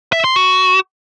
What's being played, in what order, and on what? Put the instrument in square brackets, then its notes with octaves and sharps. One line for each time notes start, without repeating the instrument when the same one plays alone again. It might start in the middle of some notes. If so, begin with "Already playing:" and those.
[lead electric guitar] E5
C6
F#4